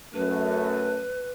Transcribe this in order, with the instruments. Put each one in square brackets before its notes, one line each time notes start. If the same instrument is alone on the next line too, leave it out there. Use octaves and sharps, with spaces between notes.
[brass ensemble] F#2 A3 [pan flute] B4